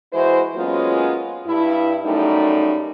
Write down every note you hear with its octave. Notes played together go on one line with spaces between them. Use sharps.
E3 G#3 E4 F#4 C5
F#3 G#3 A#3 B3 C#4 F4
G2 E4
F#2 G3 A3 D#4